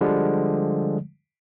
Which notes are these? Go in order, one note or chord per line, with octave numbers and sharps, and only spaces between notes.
D3 F3 G3 G#3